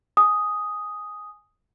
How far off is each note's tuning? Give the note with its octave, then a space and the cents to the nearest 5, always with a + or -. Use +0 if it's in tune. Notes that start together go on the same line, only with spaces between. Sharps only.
G#5 +0 D#6 +0